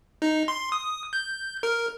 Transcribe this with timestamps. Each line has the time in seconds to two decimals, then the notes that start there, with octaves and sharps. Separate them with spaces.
0.22 D#4
0.48 C6
0.72 D#6
1.13 G6
1.63 A#4